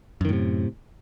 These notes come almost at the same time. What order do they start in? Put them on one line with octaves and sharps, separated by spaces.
F#2 D#3 A2 C3